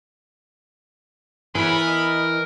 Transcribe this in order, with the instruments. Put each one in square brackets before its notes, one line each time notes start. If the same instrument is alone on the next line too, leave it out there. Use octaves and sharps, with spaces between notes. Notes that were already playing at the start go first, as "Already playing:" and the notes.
[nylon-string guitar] E3 [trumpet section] B3 B5 [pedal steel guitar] G#4 B4 C#5 [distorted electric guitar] A#4
[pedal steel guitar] D#5